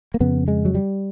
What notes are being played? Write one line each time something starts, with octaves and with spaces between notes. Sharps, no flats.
A#3
F2 C#3 B3
G#3
F#3
G3